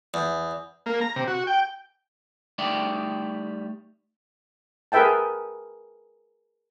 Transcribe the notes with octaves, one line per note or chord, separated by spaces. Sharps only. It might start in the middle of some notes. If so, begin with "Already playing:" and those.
E2
A#3
A#5
C3
F#4
G5
G3 A3 D#4 D5 E5 G5
G#4 A#4 B4 E5 G5 A5